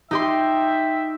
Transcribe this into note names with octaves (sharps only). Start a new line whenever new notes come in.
D#4 G4 E5 G5 C6